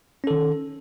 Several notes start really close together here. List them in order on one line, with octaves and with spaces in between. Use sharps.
C#4 A4 D#3